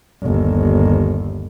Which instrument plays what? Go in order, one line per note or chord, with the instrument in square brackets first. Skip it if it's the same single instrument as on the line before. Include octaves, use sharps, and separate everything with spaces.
[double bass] G1 D#2